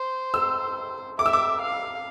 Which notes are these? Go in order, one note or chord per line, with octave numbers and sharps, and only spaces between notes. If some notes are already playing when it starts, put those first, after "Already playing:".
Already playing: C5
E6
E5 D6
E6
D6
F5